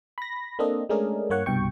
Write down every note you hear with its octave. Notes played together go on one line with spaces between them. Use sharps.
B5 A#6
A#3 C4 D4 A4 D#5
G#3 A3 C#4 D4 G#4 A#4
G2 A#3 C#5 F#5 C#6
C2 G2 B2 G5 C#6